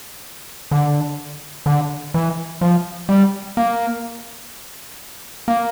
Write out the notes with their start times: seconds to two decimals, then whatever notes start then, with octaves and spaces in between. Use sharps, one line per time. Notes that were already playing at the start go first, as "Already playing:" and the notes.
0.71 D3
1.66 D3
2.14 E3
2.61 F3
3.09 G3
3.57 A#3
5.48 A#3